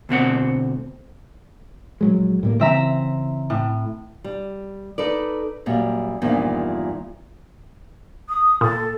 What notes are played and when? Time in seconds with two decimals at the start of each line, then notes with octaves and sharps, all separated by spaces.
0.09 D2 B2 C4 F#5
2.01 A#1 F#3 G#3
2.43 A2 G3 A#3
2.60 C#3 E3 C4 E5 A#5
3.50 A2
4.24 G3
4.98 D#4 A4 B4 D5
5.66 F#2 A#2 G3
6.22 E2 G2 A#2 D#3 F3
8.28 D#6
8.61 A#2 A4